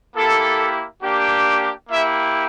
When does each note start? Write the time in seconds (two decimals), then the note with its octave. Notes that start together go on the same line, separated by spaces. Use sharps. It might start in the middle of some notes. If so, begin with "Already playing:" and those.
0.16 A#3 E4 G4 A4
1.02 A#3 D4 G4
1.90 A#3 E4 G4 E5